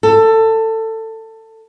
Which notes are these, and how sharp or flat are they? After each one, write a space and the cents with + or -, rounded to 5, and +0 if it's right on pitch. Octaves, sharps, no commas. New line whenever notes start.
A4 +20